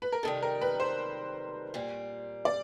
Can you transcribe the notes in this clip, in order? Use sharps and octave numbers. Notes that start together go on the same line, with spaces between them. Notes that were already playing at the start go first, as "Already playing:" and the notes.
B4
A#4
C3 D#3 G3 A4
A#4
B4
C5
A#2 G3 C4
D5